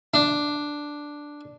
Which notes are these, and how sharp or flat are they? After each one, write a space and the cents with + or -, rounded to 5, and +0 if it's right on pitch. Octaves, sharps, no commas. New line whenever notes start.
D4 +0